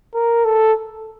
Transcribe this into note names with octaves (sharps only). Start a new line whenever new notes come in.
A#4
A4